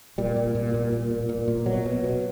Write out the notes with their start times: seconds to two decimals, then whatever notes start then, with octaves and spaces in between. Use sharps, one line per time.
0.18 A#2 G3
0.36 A#2
0.55 A#2
0.74 A#2
0.93 A#2
1.11 A#2
1.29 A#2
1.48 A#2
1.66 B2 F#3
1.85 B2
2.04 B2